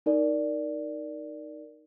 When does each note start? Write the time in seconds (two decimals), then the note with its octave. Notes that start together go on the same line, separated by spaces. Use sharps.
0.06 D#4 A#4 D5